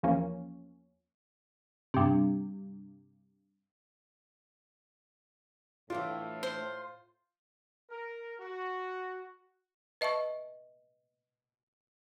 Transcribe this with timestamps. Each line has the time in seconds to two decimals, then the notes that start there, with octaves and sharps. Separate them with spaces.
0.03 E2 F3 A#3 C#4
1.94 G2 C3
5.90 A2 E3 A3 D4 F4
6.43 C5
7.90 A#4
8.39 F#4
10.01 B4 D#5 E5 A5 C#6